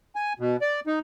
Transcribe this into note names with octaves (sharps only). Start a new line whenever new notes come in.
G#5
B2
D5
D#4